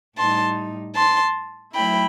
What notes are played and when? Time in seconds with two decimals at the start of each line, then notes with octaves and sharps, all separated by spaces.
0.17 A2 G3 D#4 A5 C6
0.96 A5 C6
1.74 F#3 A3 E4 G5 B5